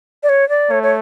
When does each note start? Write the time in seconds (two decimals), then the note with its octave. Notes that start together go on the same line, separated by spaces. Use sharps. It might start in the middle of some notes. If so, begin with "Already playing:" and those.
0.23 D5
0.29 C#5
0.49 D5
0.71 A3 C#5
0.83 C#5